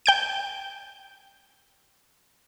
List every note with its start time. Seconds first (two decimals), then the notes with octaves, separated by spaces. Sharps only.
0.06 G5 G6 D7